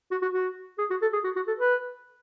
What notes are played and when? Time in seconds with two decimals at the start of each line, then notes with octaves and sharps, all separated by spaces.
0.11 F#4
0.22 F#4
0.33 F#4
0.78 G#4
0.90 F#4
1.02 A4
1.13 G#4
1.24 F#4
1.36 F#4
1.48 A4
1.59 B4